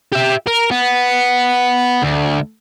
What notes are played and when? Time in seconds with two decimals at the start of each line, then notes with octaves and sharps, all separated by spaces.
0.13 G4 E5
0.47 A#4
0.71 B3
2.04 D2